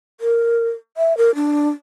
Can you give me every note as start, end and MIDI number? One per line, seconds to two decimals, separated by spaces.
0.21 0.69 70
0.97 1.16 76
1.17 1.34 70
1.35 1.69 62